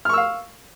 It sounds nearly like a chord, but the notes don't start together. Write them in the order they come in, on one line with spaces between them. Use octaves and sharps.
F6 C#6 E6 F5